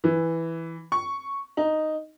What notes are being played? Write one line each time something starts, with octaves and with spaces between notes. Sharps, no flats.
E3
C#6
D#4